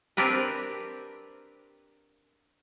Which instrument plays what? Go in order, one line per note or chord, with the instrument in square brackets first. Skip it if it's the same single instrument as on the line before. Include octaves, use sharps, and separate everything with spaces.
[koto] C4 D4 G4 A#4 B4